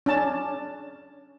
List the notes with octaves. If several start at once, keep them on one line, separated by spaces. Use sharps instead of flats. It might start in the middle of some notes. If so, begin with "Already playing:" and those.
C#4 D4 A5